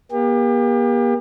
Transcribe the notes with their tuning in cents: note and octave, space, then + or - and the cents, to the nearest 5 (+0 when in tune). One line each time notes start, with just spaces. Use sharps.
A#3 +40 G4 +35